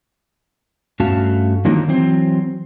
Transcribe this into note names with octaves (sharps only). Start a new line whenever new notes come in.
G2 A3 C#4 F#4 F5 A5
D#3 F3 F#3 A#3 D4 D#4
E3 F#3 C4 C5